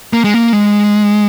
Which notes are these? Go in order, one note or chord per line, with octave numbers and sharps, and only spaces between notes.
A#3
G#3
A#3
G#3